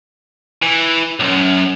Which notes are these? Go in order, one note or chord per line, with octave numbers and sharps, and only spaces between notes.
E3
B1 F#2